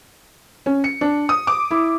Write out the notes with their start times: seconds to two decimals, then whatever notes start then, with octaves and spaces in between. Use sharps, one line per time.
0.66 C#4
0.84 C#7
1.01 D4
1.29 D#6
1.47 D6
1.71 E4